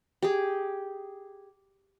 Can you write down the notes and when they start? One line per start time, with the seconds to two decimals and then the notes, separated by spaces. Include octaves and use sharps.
0.22 G4 G#4